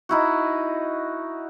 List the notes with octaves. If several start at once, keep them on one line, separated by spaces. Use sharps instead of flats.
D#4 E4 F#4